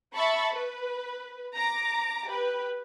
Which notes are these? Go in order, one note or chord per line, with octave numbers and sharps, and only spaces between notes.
E5 A5 B5 C#6
B4
A#5 D6
G4 B4